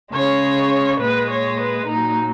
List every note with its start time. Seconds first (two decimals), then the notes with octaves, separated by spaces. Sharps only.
0.12 C#3 G#3 C#5
1.00 A#2 G#3 B4
1.30 C#5
1.58 B4
1.87 A#2 F#3 D#4